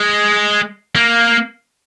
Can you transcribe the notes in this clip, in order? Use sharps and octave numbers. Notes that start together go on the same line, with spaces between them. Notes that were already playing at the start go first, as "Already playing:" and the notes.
Already playing: G#3
A#3